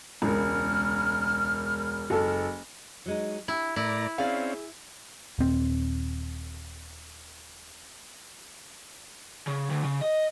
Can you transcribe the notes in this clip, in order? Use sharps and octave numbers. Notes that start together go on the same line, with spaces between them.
E1 C#2 A#4 F6
F#1 A4
F#3 G#3 D#4
D4 E4 G4
A2 E4 A#4 D5 A#5
C4 C#4 G#4 D5 F5
D#1 C4
C#3
D2
C#3
D#5